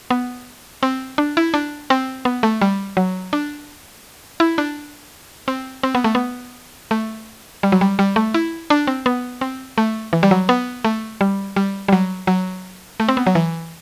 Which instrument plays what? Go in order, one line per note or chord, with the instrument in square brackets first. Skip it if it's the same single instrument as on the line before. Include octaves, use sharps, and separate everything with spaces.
[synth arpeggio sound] B3
C4
D4
E4
D4
C4
B3
A3
G3
F#3
D4
E4
D4
C4
C4
B3
A3
B3
A3
G3
F#3
G3
G3
A3
E4
D4
C4
B3
C4
A3
E3
G3
F#3
B3
A3
G3
G3
G3
F#3
F#3
A3
C4
B3
F#3
E3